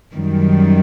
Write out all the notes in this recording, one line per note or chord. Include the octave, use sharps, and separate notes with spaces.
F#2 D#3 G3